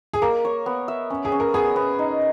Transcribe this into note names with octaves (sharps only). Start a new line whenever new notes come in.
G#4
A#3 A#4
C#5
B3
E5
C#4
G#4
C#4
A#4
B3 G#4
B3
D#4